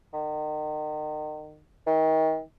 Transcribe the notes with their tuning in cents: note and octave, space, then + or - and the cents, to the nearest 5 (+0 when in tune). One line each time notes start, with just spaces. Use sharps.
D#3 -35
D#3 +35